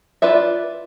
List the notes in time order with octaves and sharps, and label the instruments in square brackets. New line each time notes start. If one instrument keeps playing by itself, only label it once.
[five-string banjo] F4 B4 D5 E5